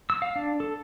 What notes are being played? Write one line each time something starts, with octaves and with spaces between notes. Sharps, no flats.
E6
F5
D4
A4